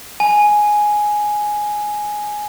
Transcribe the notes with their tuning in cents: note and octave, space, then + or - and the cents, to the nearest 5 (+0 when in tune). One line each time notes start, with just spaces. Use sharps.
G#5 +5